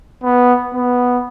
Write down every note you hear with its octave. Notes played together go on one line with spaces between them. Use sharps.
B3
B3